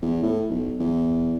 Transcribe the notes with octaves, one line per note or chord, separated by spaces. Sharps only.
E2
A2
B1
E2